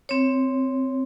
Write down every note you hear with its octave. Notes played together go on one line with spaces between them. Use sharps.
C4 C#5